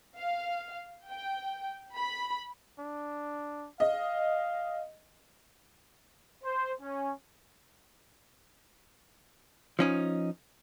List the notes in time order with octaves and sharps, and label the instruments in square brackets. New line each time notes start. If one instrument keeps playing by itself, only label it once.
[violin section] F5
G5
B5
[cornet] D4
[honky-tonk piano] D#5 [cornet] F5
[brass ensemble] C5
C#4
[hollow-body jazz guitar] F3 C#4 D#4